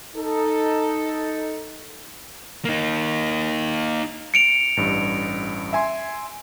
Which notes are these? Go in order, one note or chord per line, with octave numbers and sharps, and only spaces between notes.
D#4 A4
A#3 D#4
C#7 D7 F7
A1 G2
E5 G#5 C6